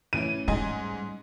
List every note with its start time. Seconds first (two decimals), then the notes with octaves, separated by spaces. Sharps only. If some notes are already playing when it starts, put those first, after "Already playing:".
0.13 A1 E3 C#4 E4 D7 D#7
0.48 G#2 G3 D#5 G#5